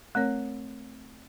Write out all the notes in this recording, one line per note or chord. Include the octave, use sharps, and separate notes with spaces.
A3 C4 A#4 C#5